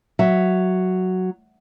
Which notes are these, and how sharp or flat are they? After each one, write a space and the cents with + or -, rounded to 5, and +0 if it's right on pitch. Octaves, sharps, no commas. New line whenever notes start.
F#3 +0 E5 +0